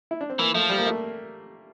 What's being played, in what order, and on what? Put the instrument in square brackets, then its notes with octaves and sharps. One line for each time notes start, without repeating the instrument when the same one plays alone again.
[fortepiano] E4
D4
C4
[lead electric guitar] E3 [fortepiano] A#3
[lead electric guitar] F3 [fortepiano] A3
[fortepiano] G3
A#3
A3